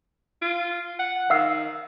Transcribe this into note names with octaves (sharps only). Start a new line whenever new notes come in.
F4
F#5
D#3 F5 E6 C7